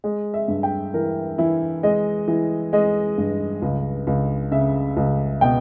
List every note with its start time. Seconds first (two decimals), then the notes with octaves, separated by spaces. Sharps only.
0.04 G#3
0.34 E5
0.48 G2
0.63 G5
0.94 E3 A#4
1.38 E3 E4
1.83 G#3 D#5
2.28 E3
2.73 G#3 D#5
3.18 G2
3.62 C#2
4.07 C#2
4.51 C#3 E5
4.97 C#2
5.41 B2 G5